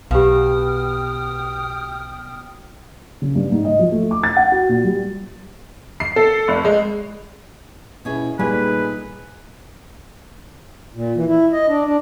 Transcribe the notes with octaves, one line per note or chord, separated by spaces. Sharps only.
B1 B2 G4 F5 G5 D#6 F6
C#3
G2
G#2
D#5
F3
A3
D6
A6
F#5
F#4
A#2
G3
C7
A4
F1
G#3
B2 C#4 E4 G#4
A#2 G3 A3 D#4 G#4 B4 G#5
A#2
E3
E4
D#5
D4
D4